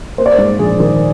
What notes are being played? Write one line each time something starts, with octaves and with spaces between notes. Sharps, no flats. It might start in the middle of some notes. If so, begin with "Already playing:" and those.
A#3 C5
D5
G#2 C5
A#1 G#4
D#3